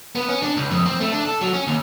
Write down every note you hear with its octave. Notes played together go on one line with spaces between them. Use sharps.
B3
C#4
D4
C#2
F2
C4
A3
D4
A4
F#3
C#4
D#2